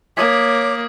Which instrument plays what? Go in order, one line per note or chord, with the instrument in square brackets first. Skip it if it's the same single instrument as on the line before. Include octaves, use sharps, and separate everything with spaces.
[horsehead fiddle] A#3 [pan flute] C#5 [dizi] D6 [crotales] D#6 G#6 B6